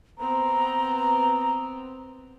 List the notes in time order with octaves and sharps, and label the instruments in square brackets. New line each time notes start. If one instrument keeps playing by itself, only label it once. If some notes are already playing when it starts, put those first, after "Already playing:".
[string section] B3 C4 [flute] A#5